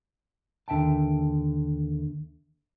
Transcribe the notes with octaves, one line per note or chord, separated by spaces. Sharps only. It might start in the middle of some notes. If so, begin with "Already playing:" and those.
D#2 D3 E5 G5 A5